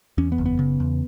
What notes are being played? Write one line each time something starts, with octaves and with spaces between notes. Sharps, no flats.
E2 C#4
B3
F#1
B3
C#3
E2